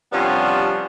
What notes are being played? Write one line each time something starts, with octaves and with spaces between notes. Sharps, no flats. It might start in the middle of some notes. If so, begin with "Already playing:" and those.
C3 F3 G3 B3 C#4 D4